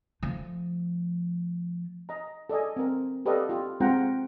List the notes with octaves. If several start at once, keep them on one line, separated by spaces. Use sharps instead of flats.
F3 A3
D#5 A#5
A4 D5 D#5 G#5
C4 A#4
G4 A4 B4 D5 D#5 F5
F4 G4
G#3 C4 F4 F#5 G5 A#5